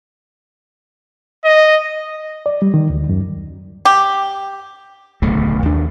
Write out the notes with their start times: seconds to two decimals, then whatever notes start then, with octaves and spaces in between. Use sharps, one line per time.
1.45 D#5
2.46 D5
2.62 G3
2.74 D#3
2.90 D2
3.09 F#2
3.85 G4
5.22 D1 B1 C#3 A3
5.62 D#2 D4